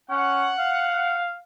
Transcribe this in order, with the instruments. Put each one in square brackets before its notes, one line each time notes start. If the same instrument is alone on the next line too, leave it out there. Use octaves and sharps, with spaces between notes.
[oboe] C#4 [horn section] F#5
[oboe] F5